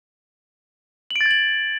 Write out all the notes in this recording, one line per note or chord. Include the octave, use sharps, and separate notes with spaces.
F#7
D7
A6
G#6
F#7